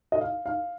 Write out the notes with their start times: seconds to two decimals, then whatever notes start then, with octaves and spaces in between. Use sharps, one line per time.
0.12 D#5
0.21 F5
0.46 F5